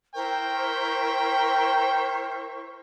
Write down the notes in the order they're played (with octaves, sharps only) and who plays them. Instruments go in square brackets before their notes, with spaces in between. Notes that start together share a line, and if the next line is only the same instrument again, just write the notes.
[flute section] E4 C5 C#6 [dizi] A#4 [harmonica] G5